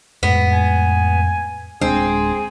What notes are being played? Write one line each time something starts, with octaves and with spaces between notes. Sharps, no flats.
F2 A2 G#3 B3
G#5
D1 G#3 C4 D4 G#4